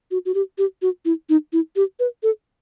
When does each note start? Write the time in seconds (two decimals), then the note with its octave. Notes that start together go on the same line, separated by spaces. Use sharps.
0.11 F#4
0.26 F#4
0.34 G4
0.58 G4
0.82 F#4
1.05 E4
1.29 D#4
1.53 E4
1.76 G4
1.99 B4
2.23 A4